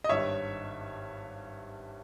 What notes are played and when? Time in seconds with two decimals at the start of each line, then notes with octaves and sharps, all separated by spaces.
0.04 D#5
0.09 G#1 G2 G3 C#5 E5